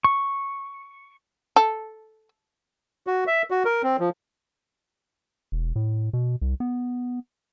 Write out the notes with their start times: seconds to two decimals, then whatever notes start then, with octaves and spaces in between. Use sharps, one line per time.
0.04 C#6
1.56 A4
3.07 F#4
3.27 E5
3.51 F#4
3.65 A#4
3.83 C4
4.00 F3
5.52 E1
5.76 A2
6.13 B2
6.41 C2
6.60 B3